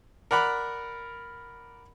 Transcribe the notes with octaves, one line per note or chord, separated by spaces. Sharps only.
A#4 D5 F#5 A#5 B5